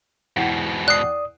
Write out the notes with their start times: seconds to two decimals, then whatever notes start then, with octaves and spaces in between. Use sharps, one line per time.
0.37 E2 G#2 B2 F#5 G5
0.88 D5 D#6 F#6 C7